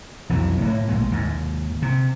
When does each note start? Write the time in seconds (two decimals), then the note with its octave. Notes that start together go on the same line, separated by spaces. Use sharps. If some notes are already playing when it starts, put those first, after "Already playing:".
0.29 B1 F2 E3 F#3
0.61 A2 A#3
0.89 A#1 G#3
1.12 D#2 G#2
1.82 C3